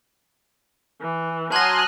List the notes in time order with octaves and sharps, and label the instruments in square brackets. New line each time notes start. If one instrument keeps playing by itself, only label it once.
[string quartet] E3
[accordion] F#3 G#5 C6 [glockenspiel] A5 A#6 [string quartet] D#6 F6 F#6